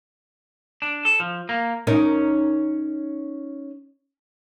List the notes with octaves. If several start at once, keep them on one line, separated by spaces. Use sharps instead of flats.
D4
A4
F3
A#3
C#4 D#4 A#4